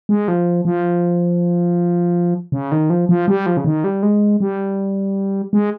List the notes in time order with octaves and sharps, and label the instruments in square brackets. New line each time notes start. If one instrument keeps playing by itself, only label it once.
[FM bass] G#3
F3
F3
C#3
D#3
F3
F3
G3
F3
C#3
D#3
G3
G#3
G3
G#3